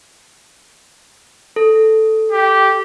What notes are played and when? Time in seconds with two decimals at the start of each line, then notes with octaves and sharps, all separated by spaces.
1.56 A4
2.32 G4